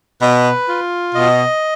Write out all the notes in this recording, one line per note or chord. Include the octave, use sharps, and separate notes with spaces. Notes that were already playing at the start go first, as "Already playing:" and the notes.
B2 B4
F4
B2 D#5